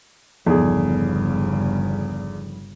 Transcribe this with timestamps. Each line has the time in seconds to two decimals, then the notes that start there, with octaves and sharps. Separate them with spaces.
0.46 G1 E2 C#3 F3 D#4 G#4 A4